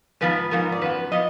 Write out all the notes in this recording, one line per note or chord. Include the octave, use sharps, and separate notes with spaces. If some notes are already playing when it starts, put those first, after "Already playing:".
G#2 F3 B3 B4
G#2 F3 B3 A#4
D5
F#2 F3 B3 B4
F3 B3 D#5